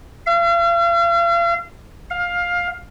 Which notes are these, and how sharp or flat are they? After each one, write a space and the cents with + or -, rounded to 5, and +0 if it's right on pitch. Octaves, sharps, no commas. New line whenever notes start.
F5 -40
F5 +15